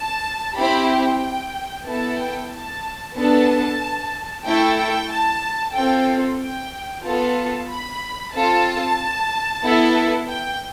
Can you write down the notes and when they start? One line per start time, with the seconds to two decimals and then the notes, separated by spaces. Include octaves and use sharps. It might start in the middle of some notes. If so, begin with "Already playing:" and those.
Already playing: A5
0.56 C4 E4 G4 B5
0.89 G5
1.86 B3 E4 A4 A5
2.19 G5
2.51 A5
3.15 B3 D4 A4 A5
4.45 A3 E4 A4 G5
4.77 G5
5.10 A5
5.74 C4 F4 A4 G5
6.39 G5
7.03 B3 F4 A4 A5
7.69 B5
8.33 C4 F4 A4 A5
9.63 B3 E4 A4
10.28 G5